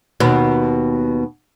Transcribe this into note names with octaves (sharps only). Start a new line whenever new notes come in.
D#2 B2